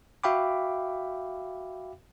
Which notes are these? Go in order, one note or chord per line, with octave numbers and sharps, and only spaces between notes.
F#4 E5 F5 G5 B5 D6